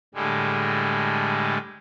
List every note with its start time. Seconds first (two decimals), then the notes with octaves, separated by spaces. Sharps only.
0.15 A2 D3 G3 G#3